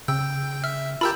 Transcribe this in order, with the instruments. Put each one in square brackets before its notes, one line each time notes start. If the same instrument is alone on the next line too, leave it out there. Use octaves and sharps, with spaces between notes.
[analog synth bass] C#3 [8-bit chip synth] G5 [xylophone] E6
[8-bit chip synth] E5 [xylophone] F6
[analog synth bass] F4 [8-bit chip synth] G4 A#4 A5 [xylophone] B5 E6 G6